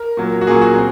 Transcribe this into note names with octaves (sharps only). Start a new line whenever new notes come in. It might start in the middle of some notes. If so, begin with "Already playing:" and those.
Already playing: A#4
A#2 F#3 A#3
F#4
A#2 F#3 A#3 C#4 G#4
F#4
C4